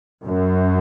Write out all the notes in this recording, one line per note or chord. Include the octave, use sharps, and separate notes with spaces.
F#2